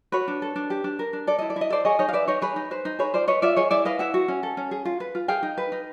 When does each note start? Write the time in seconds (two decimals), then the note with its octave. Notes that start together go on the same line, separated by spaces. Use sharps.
0.12 F#4 B4 C#5
0.28 D4
0.42 A4
0.56 D4
0.70 G4
0.84 D4
0.99 A#4
1.13 D4
1.27 A4 D5
1.39 E4 D#5
1.50 D5
1.56 E4
1.61 D#5
1.70 A4 C5 D5
1.85 G#4 C#5 D#5
1.99 D#4 C#5 D#5
2.08 F5
2.13 B4 D5 E5
2.28 D#4 C#5 D#5
2.42 G#4 B4 C#5
2.56 D#4
2.71 B4 C5
2.85 D#4
2.99 G#4 B4 C#5
3.14 F4 C5 D5
3.28 B4 C#5 D#5
3.42 F4 D5 E5
3.56 G#4 C#5 D#5
3.71 E4 D5 E5
3.85 B4 D#5 F5
3.99 E4 E5 F#5
4.14 F#4
4.28 C#4
4.43 A4
4.57 C#4
4.71 G#4
4.85 F4
5.00 B4
5.15 F4
5.28 G#4 F5 G5
5.43 D#4
5.58 B4
5.72 D#4